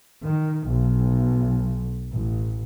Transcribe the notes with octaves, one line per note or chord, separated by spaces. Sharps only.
D#3
B1
A1